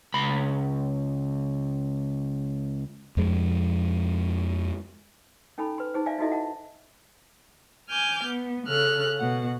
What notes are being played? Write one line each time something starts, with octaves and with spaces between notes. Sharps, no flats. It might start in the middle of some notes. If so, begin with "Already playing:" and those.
C#2 B5
F2 F3 G#3
C#4 D#4 A4 G#5 B5
B4 C6
D#4 G#4 C5
D5 E5 F5 G#5
D#4 E4 F#4 A4 D#5 E5
F#5 A5
G#5 D6 F6 G6
B3
C#3 A4 F6 F#6
B2 F#5